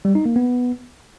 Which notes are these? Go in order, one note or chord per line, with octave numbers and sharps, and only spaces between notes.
G3
D#4
A#3
B3